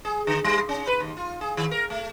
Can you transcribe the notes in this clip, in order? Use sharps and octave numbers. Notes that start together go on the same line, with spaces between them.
G#4
D3
G3
C#4
B4
D#2
F4
G#4
D#3
A#4
A3